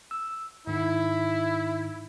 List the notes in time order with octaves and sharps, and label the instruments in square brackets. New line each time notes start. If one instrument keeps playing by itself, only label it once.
[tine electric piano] E6
[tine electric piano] G#2 D#3 D#4 [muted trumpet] E4